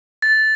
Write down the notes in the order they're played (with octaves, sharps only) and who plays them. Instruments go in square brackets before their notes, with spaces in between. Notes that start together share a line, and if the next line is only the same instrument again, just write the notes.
[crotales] A6